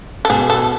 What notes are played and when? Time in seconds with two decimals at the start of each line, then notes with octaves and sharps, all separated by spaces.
0.25 A4
0.30 B2 G#4
0.50 A4